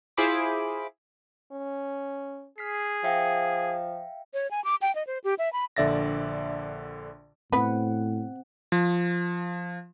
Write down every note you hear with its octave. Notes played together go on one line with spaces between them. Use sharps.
E4 F4 G#4 C5 B5 D6
C#4
G#4 F6 B6 C7
F3 E5 F5 G5
C#5
G#5
D6
G5
D#5
C5
G4
E5
B5
A#1 D3 D5 E5 A6 A#6
A2 B3 C4 B4 F#5
F3